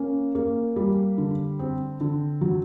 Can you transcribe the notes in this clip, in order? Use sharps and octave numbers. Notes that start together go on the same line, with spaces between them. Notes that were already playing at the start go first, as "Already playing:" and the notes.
Already playing: A#3 C#4
A#3
G3
D3
C4
D3
F#3